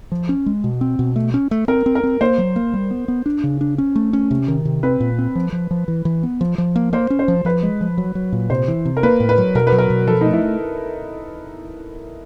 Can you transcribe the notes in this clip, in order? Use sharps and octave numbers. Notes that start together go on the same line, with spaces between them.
F3
C#4
G#3
B2
C4
B2
A3
C#4
A3
C4 A#4
C4
A#4
C4
A#3 C5
F#3
A#3
G3
B3
B3
D4
C#3
D4
C#4
A3
C#4
C3
D#3
C3
C4 B4
A#2
C4
F3
F3
F3
E3
E3
B3
F3
F3
A#3
A#3 C5
C#4
C5
F3
F3 B4
G#3
F3
F#3
F#3
A#2
C3 C5
E3
C3
A#4
A#3 B4
A2
B4
F#3
B2 A#4
B4
F#3
A#4
B2
F3 A4
D#4
A3
E4